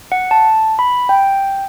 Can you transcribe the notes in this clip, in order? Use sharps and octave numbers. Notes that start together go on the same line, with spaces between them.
F#5
A5
B5
G5